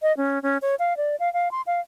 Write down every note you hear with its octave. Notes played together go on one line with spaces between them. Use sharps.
D#5
C#4
C#4
C#5
F5
D5
F5
F5
C6
F5